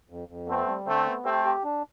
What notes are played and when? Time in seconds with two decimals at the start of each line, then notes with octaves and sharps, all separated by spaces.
0.10 F2
0.28 F2
0.47 A3 B3 C4
0.67 G3
0.86 D3 A3 C4
1.06 B3
1.25 A3 C4 G4
1.45 G4
1.64 D4